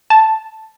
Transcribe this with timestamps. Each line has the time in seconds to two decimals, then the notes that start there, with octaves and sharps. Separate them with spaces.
0.10 A5